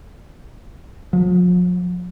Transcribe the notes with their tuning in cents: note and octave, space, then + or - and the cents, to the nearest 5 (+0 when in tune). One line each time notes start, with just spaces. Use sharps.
F3 +45